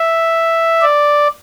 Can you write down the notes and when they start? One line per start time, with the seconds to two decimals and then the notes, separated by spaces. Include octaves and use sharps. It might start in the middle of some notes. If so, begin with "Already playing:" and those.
Already playing: E5
0.82 D5